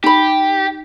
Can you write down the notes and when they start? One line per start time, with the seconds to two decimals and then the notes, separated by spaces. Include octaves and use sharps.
0.04 D#4 G4 B5